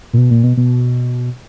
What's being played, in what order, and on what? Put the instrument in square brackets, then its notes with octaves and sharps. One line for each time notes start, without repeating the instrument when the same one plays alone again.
[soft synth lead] A#2
B2
A#2
B2
B2